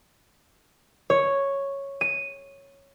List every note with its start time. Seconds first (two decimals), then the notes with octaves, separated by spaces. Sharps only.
1.10 C#5
2.01 D#7